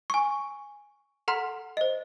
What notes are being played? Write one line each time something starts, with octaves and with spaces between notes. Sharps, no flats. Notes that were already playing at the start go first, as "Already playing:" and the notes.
G#5 C#6
A4 F#5 A#5 C6 F6 B6
C5 D#5